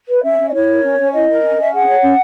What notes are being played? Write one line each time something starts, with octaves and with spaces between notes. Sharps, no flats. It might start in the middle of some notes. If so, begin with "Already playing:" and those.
B4
C#4 E5
C#4
D#5
E4 C#5
A#4
C#4
C#4
E4 D#5
A#4
C#4
C#4 E5
G#4 F#5
C#5
C#4